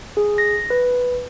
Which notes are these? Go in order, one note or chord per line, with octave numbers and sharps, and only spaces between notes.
G#4
A#6
B4